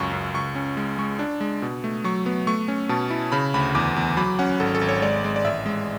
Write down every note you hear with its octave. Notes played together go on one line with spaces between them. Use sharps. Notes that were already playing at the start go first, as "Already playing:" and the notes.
Already playing: C#2 F#2 C#6
F#2
C#2 C#6
C#4
G#3
G#3 C#6
D4
G#3
B2
A3
F#3 C#6
B3
A3 C#6
C#4
B2 A5
E4
C#3 B5
D2 B5
E2 D6
E2
F#3 B5
C#4 F#5
G#1 A4
A4
G#1
C#5
G#3 D5
G#3
D5
A1 E5
G#3